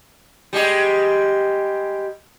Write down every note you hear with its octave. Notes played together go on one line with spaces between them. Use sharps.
G3 G#3 G4